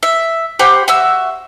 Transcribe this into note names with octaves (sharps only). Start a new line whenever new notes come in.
E5
G4 C5 F#5 B5
F#4 E5 E6